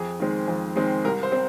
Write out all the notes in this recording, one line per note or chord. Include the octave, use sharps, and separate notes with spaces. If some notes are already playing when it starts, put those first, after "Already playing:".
Already playing: F2 G#4
D#3 G#3 C4
F2
D#3 G#3 C4
C2 A#4
C5
C4